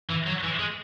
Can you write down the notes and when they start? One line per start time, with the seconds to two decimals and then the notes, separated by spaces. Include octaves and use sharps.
0.10 E3
0.27 F#3
0.44 E3
0.59 G#3